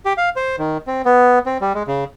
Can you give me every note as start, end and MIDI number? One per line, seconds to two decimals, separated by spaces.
0.05 0.13 67
0.18 0.29 77
0.36 0.56 72
0.58 0.78 51
0.87 1.02 60
1.05 1.39 59
1.46 1.58 60
1.61 1.73 55
1.75 1.83 56
1.87 2.04 49